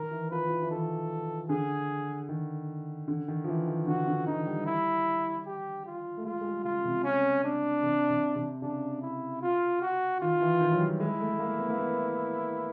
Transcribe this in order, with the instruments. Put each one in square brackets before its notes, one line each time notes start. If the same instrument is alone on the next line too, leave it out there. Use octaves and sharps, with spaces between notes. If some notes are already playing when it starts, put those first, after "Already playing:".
Already playing: [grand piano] D#3 [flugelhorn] A#4
[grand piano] E3
[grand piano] F3 [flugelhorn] B4
[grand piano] F3
E3
E3
[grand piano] D#3 [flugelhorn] A4
[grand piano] D3 [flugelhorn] G#4
[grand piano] D#3
D3
D#3
F3
E3
D#3
[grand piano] D3 [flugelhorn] F#4
[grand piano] D3
[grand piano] D3 [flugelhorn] D#4
[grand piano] G3
[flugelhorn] E4
G4
F4
[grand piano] A3
[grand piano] G#3 [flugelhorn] F4
[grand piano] G#3
G3
[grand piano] C#3 [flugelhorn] F4
[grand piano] C3
[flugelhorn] C#4
D4
[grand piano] C3
C3
C3
[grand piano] C#3 [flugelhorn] D4
[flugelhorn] E4
F4
F#4
[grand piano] D#3 [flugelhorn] F4
[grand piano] E3
D#3
F#3
G3
[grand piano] G#3 [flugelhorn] E4
[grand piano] A3
A3
A#3
B3
A#3
B3